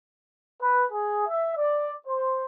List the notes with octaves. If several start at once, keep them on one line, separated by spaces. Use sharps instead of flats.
B4
G#4
E5
D5
C5